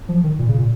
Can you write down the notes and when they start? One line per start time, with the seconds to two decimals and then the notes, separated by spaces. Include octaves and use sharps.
0.09 F3
0.24 D#3
0.39 A#2
0.48 C#3
0.58 A#2